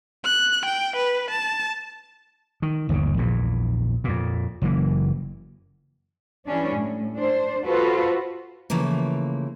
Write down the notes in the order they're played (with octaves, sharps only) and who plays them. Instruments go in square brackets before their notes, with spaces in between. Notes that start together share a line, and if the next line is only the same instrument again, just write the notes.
[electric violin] F#6
G5
B4
A5
[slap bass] D#3
G1 D#2 A#2 C#3
A#1 E2 A#2
F2 A#2
F#1 E3 A#3
[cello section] E3 G3 C#4 D4
A2
D4 C5
F4 F#4 A4 B4 C5
[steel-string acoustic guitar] C#3 E3 F3 A3 A#3